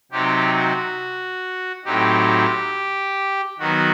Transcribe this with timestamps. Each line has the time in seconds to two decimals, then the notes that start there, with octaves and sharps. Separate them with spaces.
0.12 C3 F#3 C4 D#4 G4
0.55 F#4
1.85 A2 F#3 C4 D#4 G4
3.59 D#3 F#3 B3 F#4